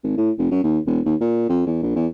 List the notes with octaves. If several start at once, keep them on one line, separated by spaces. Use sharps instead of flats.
G#1
A2
F1
F#2
D#2
E1
D#2
A#2
F2
E2
A#1
E2